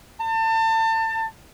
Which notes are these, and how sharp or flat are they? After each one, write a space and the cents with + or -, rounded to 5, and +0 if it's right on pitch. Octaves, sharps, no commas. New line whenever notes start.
A5 +30